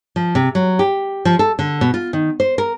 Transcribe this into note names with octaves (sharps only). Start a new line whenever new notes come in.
F3
C3
F#3
G4
F3
A4
D3
B2
F4
D#3
C5
A#4